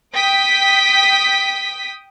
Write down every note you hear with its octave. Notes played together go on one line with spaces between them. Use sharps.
G5 D#6 B6